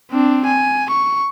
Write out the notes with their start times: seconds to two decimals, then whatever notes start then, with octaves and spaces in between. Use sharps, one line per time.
0.11 C4 D4
0.45 G#5
0.90 C#6